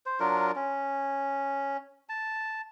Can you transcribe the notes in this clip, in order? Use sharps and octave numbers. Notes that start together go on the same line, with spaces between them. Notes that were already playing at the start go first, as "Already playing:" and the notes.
C5
F#3 D4 F4 A#4
C#4
A5